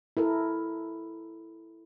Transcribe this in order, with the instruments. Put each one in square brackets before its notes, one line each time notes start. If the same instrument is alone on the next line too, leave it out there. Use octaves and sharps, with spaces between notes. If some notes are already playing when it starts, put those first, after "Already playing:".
[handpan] E4 A4 A#4